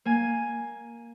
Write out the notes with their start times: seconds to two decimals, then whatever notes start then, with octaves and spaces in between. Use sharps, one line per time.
0.05 A#3 G#5